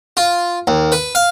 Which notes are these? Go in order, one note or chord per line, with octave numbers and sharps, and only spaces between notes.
F4
D#2
B4
F5